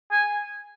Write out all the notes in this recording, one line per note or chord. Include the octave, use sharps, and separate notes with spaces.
G#5